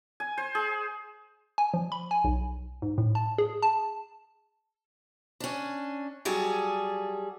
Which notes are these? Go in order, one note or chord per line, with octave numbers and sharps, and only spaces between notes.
G#5
C5
G#4
G#5
F3
B5
G#5
B1
G#2
A2
A5
G#4
A5
C#4 D4
F#3 G3 G#4 A4